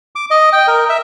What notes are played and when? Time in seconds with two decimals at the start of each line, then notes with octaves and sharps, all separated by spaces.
0.16 D6
0.31 D#5
0.53 G5
0.68 A#4
0.89 E5